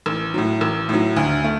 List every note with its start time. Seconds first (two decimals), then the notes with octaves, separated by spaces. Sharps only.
0.06 A1
0.34 A2 F#3
0.61 A1
0.89 A2 F#3
1.16 D2
1.44 A3